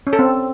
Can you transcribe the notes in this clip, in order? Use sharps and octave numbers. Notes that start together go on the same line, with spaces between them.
C#4
A4
C4